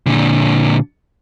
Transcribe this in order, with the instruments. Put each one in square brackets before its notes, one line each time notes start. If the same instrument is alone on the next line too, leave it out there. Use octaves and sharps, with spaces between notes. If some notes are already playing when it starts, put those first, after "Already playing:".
[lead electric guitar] A#2 D3